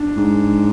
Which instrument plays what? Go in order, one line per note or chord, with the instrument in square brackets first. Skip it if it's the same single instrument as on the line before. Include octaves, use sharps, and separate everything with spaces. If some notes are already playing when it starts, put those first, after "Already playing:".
Already playing: [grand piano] D4
[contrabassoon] G#2